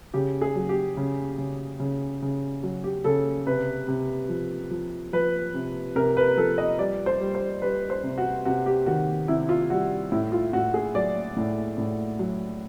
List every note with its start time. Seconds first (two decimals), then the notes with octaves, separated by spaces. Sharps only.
0.14 C#3 G4
0.41 G#4
0.55 F#3
0.69 G4
0.97 C#3
1.38 C#3
1.80 C#3
2.22 C#3
2.63 F#3
2.84 G4
3.04 C#3 A4
3.46 C3 B4
3.88 C3
4.29 F3
4.71 F3
5.13 F3 B4
5.54 C3
5.96 C3 A#4
6.17 B4
6.37 F3 A4
6.58 D#5
6.79 G3 D5
7.06 C5
7.20 G3
7.35 C5
7.62 G3 B4
7.90 C5
8.03 C3
8.18 F#4
8.45 C3 F#4
8.66 G4
8.86 D#3 F#4
9.28 C3 E4
9.49 F4
9.70 G3 F#4
10.12 A2 E4
10.32 F4
10.53 A2 F#4
10.74 G#4
10.95 F#3 D5
11.36 A2
11.78 A2
12.19 F#3